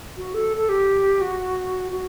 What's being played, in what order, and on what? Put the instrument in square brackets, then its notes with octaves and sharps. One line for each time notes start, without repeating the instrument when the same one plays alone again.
[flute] F#4
A4
A4
G4
F#4
F#4